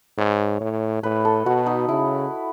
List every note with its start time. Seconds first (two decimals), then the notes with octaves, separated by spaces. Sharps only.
0.18 G#2 C#5
0.61 A2
1.03 A2 B4
1.25 A4
1.46 B2 F#4
1.66 D#4
1.88 C#3 E4